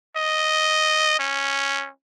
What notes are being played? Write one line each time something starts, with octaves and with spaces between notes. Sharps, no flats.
D#5
C#4